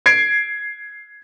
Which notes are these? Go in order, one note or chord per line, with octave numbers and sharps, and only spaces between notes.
G#6 C7 D7